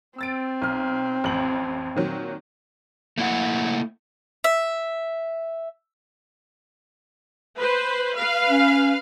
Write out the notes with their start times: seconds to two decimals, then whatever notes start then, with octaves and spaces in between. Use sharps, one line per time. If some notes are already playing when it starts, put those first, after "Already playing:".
0.18 C4 E6 A6 D7
0.62 B1 F6
1.24 A1 F2 F#7
1.95 A#2 D#3 F#3
3.18 A3 A#3 E4 F#5
4.44 E5
7.57 B4 C5
8.14 B4 F5
8.49 C#4